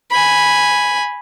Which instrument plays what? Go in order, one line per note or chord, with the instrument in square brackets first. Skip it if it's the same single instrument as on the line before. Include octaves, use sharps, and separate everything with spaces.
[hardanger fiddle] G#5 B5